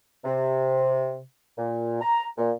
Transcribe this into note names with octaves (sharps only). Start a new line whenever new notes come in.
C3
A#2
A#5
A#2